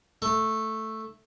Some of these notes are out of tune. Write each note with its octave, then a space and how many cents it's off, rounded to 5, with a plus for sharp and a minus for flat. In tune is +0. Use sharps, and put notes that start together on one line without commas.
A3 +0 A5 +40